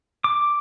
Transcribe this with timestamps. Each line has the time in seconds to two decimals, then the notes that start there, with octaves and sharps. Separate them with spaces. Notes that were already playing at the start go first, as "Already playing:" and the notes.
0.24 D6